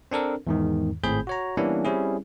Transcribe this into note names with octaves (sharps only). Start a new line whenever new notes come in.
C4 D4 A4 A#4
E2 G#2 D#3
G#1 A2 C4 G#4 B5 G6
F#4 C#5 A#5
E3 G3 A#3 B3 C#4 D4
G3 C4 C#4 E4 G#4